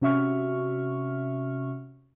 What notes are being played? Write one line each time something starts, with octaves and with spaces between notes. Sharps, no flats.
C3 C#4 F#4 E5 C#6 F6